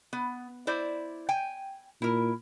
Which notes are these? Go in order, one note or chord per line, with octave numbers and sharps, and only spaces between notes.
B3
E4 C5 D5
G5 G#5
A#2 E4 A#4